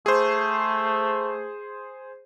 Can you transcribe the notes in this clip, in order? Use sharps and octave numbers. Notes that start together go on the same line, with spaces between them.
A3 G#4 C5